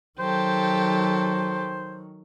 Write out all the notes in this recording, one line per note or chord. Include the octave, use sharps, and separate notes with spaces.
D#3 F#3 G4 A4 C5